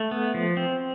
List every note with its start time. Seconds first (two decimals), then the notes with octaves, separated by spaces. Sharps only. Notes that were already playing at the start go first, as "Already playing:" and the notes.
Already playing: A3
0.11 B3
0.34 F3
0.57 C4